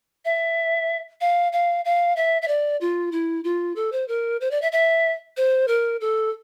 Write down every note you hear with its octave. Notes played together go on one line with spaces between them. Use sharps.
E5
F5
F5
F5
E5
E5
D5
F4
E4
F4
A4
C5
A#4
C5
D5
E5
E5
C5
A#4
A4